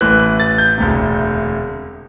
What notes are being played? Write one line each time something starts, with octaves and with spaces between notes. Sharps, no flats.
A1 A2 E3 F#6
F#6
A6
G6
E1 D2 C3